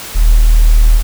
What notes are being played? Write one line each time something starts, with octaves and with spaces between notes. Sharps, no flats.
D#1